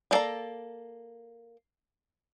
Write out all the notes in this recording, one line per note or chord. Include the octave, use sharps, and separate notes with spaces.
G3 A#3 A4 D5 A#5